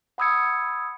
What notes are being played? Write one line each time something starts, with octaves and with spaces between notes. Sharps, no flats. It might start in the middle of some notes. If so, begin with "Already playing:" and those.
F#5 B5 D#6 E6 G#6 C#7